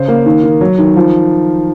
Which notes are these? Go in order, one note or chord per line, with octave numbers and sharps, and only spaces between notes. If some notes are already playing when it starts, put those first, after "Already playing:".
Already playing: C#3 C5
A#3
D#3
D#3
F#3
D#3
F3